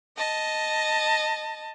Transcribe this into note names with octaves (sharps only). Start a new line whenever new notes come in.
D#5 A5